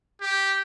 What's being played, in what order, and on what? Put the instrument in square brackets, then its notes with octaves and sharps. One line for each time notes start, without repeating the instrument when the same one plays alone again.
[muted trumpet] G4